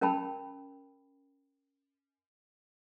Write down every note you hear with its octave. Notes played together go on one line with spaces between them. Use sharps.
C#4 A#4 G5 A5 B5